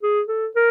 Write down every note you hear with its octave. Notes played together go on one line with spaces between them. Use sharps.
G#4
A4
A#4